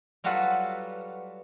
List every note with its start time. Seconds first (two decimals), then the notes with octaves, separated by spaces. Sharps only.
0.24 F#3 G3 F4 F#4 A4 B4